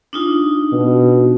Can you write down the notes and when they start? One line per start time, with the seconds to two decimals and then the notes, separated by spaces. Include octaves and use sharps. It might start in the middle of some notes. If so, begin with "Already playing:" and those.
0.13 D4 D#4 F4
0.72 B2